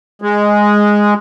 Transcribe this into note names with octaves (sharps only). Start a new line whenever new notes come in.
G#3